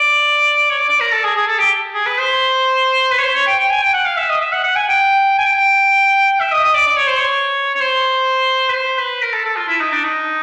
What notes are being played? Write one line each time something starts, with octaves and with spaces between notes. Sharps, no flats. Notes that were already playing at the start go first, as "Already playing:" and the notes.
Already playing: D5
C#5
D5
D5
A#4
A4
G#4
G#4
A4
G4
G#4
B4
C5
B4
C#5
C5
C#5
G5
G5
G#5
G5
F#5
F5
E5
D#5
E5
F#5
F#5
G#5
G5
G#5
G5
E5
D#5
D#5
D5
D5
C#5
C5
C#5
C#5
C5
B4
C5
B4
A#4
A4
A4
F4
E4
D#4
D4
D#4